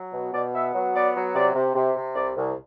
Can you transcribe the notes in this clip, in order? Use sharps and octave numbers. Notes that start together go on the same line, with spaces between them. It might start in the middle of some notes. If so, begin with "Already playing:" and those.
Already playing: F#3
B2
B2 D5
B3 E5
F#3
B3 D5
F#3
C3 D5
C3
C3
C3
C2 D5
C2